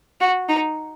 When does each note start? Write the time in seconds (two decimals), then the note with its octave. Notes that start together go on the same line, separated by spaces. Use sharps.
0.21 F#4
0.49 D#4